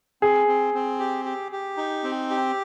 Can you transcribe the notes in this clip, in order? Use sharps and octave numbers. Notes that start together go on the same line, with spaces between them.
C4 G#4
C4
C4
G4
G4
G4
D#4
C4
G4